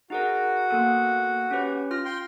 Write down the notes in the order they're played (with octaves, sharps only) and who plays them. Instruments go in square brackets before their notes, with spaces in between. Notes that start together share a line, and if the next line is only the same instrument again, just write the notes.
[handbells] D#4 G#4 A#4 [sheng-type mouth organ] F#4
[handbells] A#3 B3 A4
C#4 G4 B4
F4 F6 A#6
[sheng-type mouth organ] G5 C6